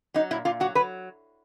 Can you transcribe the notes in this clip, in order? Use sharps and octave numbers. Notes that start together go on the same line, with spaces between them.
F#3 D#4
A#2 E4
A#2 F4
F#3 F#4
F#3 B4